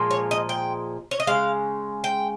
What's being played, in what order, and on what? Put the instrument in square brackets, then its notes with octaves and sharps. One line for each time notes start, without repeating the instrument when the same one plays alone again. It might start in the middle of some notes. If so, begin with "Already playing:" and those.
Already playing: [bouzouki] A#2 F3 G#3
C#5
D#5
G5
C#5
D#5
C#3 G#3 F5
G5